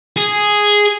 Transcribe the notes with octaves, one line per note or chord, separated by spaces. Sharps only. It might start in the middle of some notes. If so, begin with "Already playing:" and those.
G#4